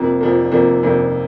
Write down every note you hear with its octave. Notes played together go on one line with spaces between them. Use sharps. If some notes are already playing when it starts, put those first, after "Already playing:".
Already playing: F2 C3 F3 A#3
F2 C3 F3 A#3
F2 C3 F3 A#3
F2 C3 F3 A#3